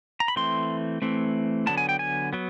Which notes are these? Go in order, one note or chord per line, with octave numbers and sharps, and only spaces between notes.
A#5
B5
E3 A3 C4 C6
E3 A3 C4
D3 F#3 B3 A5
G#5
G5
G#5
F#3 B3